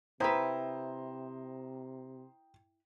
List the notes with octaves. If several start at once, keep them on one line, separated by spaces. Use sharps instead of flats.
C3 E4 B4 C5 G5 A#5 D#6